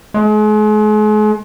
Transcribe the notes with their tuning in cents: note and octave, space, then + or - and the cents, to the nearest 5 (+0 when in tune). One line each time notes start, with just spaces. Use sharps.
G#3 +40